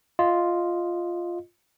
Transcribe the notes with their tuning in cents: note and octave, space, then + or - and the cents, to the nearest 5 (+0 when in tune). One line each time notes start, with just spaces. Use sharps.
F4 +0 D#5 +0